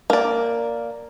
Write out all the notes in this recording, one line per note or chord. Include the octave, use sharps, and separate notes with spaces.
A#3 D5